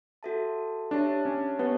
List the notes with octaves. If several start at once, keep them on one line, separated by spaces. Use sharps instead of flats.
F#4 A4 E5 A5
D4 G4 C#5 E5 A5
C#4
B3 G4 C#5 E5 A5